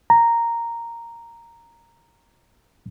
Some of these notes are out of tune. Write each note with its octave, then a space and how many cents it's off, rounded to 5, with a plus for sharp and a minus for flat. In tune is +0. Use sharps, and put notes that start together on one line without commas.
A#5 -5